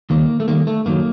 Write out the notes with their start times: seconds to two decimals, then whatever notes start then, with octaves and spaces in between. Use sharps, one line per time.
0.10 D#2 D#3 G3 A#3
0.40 A3
0.48 D#2 D#3 G3 A#3
0.67 A3
0.86 F#2 D#3 F#3 A#3